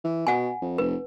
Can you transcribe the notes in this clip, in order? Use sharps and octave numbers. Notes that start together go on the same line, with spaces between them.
E3
B2 F#5 G#5
F2
F1 B4